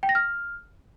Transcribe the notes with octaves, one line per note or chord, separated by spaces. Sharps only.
G5
A#6
F6